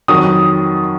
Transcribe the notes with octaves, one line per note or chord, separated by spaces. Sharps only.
F2 D#3 F#3 D#6